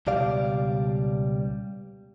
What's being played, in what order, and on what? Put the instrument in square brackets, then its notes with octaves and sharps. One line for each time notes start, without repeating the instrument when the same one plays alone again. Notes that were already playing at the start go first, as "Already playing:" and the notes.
[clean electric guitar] C#2 B2 G3 D5 F5